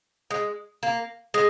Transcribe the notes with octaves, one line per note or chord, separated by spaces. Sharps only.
G#3
A#3
G#3